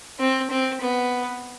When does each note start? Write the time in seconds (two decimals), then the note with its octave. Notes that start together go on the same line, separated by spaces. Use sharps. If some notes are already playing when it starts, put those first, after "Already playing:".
0.19 C4
0.50 C4
0.81 B3